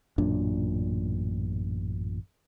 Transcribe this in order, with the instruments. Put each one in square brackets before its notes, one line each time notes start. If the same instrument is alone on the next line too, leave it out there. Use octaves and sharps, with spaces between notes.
[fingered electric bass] A1 F#2 A#2 D4